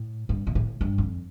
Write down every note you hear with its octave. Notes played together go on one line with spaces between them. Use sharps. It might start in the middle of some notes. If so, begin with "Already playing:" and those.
Already playing: A2
G2
A#2
A2
G2
F2